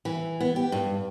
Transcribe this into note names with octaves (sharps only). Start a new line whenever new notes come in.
E3
B3
G4
G2